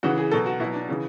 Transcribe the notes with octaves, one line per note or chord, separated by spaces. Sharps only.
C#3 E3 F#4
G#4
B2 F#3 A4
F#4
B2 F#3 E4
D4
C#3 E3